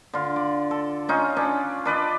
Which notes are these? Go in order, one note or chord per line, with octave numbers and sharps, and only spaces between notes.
D3 F4
D5
A4
C#4 D#4 F4
C#4 D4
D4 B4 D5 D#5